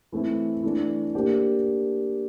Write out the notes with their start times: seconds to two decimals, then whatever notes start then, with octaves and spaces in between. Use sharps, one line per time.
0.12 E3 A3 C4 E4
0.63 E3 A3 D4
1.15 A#3 D4 G4 C5